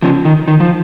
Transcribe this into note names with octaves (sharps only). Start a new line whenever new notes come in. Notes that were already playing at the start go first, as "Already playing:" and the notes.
C#3 F3
D#3
D#3
F3